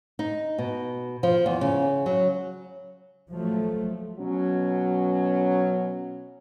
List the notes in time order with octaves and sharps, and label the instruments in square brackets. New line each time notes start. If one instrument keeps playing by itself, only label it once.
[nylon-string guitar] D#4
B2
F3
E2
C#3
F#3
[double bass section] F3 F#3 A3
[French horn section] B2 F#3 C#4